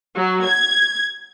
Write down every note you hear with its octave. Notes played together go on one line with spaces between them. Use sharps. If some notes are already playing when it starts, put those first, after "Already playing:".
F#3
G#6